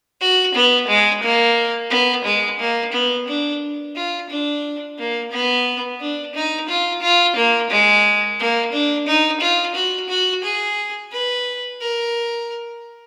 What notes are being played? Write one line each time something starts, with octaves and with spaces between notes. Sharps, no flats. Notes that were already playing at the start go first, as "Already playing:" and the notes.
F#4
B3
G#3
A#3
B3
G#3
A#3
B3
D4
F4
D4
A#3
B3
D4
D#4
F4
F4
A#3
G#3
A#3
D4
D#4
F4
F#4
F#4
G#4
B4
A#4